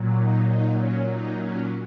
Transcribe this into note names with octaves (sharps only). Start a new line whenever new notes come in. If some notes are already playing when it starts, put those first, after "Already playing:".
Already playing: A#2 F#3
D#4
D#4
C#4
D#4
C#4